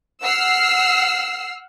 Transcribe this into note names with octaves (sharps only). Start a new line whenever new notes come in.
F#5 E6 F6 C7